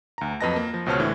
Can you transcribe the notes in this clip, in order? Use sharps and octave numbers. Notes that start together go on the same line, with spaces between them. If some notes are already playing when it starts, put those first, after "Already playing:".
D2 A#5
F2 F#3 B4 D#5 A5 A#6
A#3
F3
C#2 B2 C5 C#5 A5 F6
A2 D3 E3 A3